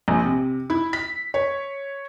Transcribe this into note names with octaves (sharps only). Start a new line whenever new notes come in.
A#1
C3
E4
B6
C#5